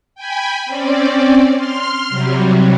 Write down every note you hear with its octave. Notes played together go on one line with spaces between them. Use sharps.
G5 G#5 B5
C4 C#4 D5
C6 F6
C3 F#3 G3